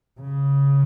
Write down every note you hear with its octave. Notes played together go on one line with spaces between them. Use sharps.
C#3